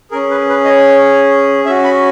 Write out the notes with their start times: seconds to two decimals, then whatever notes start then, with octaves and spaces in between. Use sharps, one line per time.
0.11 C#4 G#4 A#4
0.31 B4
0.49 B4
0.65 D#5
0.69 C#5
1.65 C#4 E5
1.69 F#4
1.84 B5